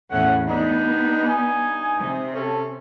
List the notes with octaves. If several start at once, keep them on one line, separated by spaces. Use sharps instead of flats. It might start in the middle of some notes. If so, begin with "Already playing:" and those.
E2 A2 A3 C#4 F#5
G3 B3 D4 D#4
G2 D#4 G#5
C3
C#4 A4